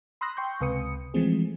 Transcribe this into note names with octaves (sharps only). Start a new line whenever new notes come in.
B5 C6 D#6 E6 F#6 A#6
G5 C6 C#6 G6
C#2 C3 B4 D#6 C#7
E3 F3 G#3 A3 C4 G#4